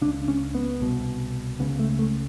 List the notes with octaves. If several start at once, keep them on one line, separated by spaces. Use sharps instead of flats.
C#2 C#3 D4
C#4
B3
C2 B2
C#2 C#3 B3
A3
A3